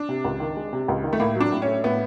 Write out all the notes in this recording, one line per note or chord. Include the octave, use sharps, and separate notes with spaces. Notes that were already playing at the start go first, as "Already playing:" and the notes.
Already playing: D4
C3
C#2
D#3
G#3
C3
C#2
D#3
A3
A2 A#3
F#3 D4
A2
C#4
A3
A2 B3